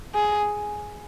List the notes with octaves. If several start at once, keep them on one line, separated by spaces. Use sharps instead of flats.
G#4